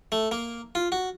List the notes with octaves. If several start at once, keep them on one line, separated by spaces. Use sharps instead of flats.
A3
A#3
F4
F#4